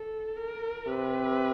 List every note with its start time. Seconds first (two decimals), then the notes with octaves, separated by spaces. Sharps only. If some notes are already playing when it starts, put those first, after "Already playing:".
Already playing: A4
0.37 A#4
0.87 C3 B4